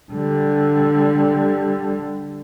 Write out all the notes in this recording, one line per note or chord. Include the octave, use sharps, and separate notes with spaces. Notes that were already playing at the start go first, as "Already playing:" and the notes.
D3 G3